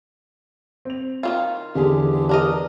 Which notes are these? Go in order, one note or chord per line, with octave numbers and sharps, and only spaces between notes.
C4 F7
D#3 E3 F4
E2 D3 G4 G#4
D4 A#4 D#5